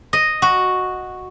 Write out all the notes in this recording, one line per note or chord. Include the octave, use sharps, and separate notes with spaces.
D#5
F#4